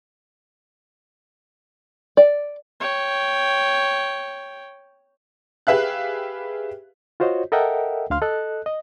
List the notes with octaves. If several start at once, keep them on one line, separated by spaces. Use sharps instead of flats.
D5
C#5 G5
G4 G#4 B4 E5 F5 F#6
F4 F#4 C5 C#5 D#5
A4 A#4 D#5 E5 F#5 G5
D2 D3 F5 C6 F6
A4 D#5 F#6
D#5